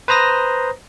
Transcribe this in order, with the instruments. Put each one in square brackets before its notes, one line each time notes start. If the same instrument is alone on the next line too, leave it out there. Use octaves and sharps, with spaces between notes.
[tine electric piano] B4 C5 A#5 D#6 A#6